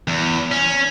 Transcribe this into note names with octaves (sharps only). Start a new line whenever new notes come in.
E2
C#4